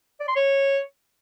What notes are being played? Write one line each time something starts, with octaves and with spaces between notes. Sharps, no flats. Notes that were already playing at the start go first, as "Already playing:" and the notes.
D5
C6
C#5